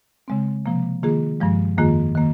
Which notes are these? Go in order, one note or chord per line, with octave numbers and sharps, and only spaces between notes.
C#3 G#3 C4
C3 F3 A#3
D#3 A#3 F4 G#4
G2 F3 G#3
F2 D#3 A#3 F4 G#4
D#3 A#3